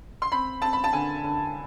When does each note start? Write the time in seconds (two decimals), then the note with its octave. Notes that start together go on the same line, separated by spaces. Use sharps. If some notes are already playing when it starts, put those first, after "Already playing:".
0.22 C6
0.32 C4 B5
0.62 C4 A5
0.73 B5
0.84 A5
0.93 D3 G#5
1.24 D3